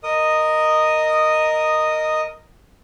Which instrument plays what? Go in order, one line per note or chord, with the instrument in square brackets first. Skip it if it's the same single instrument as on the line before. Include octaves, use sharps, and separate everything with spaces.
[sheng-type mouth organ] A#4 D#5 D#6